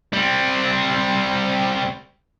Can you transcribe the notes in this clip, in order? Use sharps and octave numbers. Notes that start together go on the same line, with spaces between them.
G3 C4